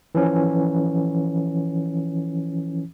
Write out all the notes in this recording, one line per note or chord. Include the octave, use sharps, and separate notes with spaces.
E3 F3 C#4